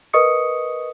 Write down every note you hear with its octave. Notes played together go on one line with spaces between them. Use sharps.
A#4 B4 D#5 C#6 D#6 C#7